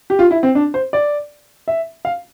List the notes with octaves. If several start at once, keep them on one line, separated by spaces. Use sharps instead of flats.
G4
F4
E4
C4
D4
C5
D5
E5
F5